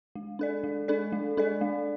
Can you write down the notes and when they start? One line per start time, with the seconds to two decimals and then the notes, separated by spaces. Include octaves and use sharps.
0.16 G#3
0.39 D4 A4 D5
0.64 G#3
0.88 D4 A4 D5
1.12 G#3
1.37 D4 A4 D5
1.61 G#3